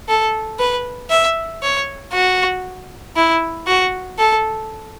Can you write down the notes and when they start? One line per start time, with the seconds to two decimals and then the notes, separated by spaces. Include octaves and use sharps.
0.08 A4
0.59 B4
1.10 E5
1.63 C#5
2.13 F#4
3.16 E4
3.67 F#4
4.19 A4